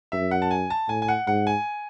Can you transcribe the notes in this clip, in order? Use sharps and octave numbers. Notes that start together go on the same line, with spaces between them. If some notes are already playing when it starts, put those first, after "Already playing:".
F#2 E5
F#5
A5
G#5
A5
A2 G#5
G#5
F#5
G#2 F#5
G#5